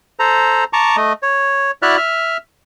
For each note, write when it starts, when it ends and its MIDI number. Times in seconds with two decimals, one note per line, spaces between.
0.19 0.64 69
0.19 0.64 72
0.19 0.64 82
0.73 0.96 81
0.73 0.96 82
0.73 0.96 85
0.73 0.96 86
0.97 1.13 57
0.97 1.13 75
1.23 1.71 73
1.82 1.97 64
1.82 1.97 66
1.82 1.97 74
1.82 1.97 76
1.82 1.97 89
1.82 1.97 90
1.97 2.37 76
1.97 2.37 89